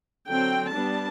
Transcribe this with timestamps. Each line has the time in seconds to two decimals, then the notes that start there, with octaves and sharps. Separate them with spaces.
0.27 D3 F#3 C4 G5
0.73 G3 B3 D4 A5